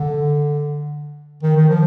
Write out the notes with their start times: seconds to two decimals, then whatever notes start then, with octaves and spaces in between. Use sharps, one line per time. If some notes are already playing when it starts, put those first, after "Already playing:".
Already playing: D3
1.43 D#3
1.56 D#3
1.69 F3